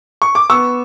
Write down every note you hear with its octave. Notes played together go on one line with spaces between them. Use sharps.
C#6
D6
B3 C#6 E6